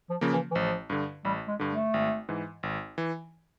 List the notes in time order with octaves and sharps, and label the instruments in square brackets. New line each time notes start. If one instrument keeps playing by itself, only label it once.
[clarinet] F3
[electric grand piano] C#3 F3 A#3
[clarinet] E3
E3
[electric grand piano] A1 [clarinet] F3
[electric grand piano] G2 D3
[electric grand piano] A1 [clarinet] G3
[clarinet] G#3
[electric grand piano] G2 D3
[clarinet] A3
[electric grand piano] G#1
G#2 E3
G#1
E3